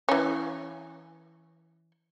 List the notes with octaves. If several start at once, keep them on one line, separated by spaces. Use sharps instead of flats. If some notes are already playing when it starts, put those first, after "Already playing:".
E3 C#4